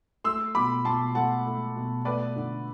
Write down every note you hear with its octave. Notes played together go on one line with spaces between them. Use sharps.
A3 C6 E6
B2 B5 D6
B2 A5 C6
A3 F#5 A5
A3
B2
A3 B4 D5
D3